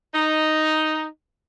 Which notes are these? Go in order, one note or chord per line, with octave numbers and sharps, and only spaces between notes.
D#4